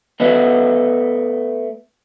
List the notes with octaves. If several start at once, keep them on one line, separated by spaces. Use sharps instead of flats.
A3 B3 B4 D5 D#5